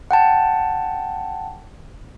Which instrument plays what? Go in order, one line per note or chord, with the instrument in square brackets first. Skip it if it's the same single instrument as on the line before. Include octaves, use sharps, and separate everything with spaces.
[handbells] F#5 G5 A5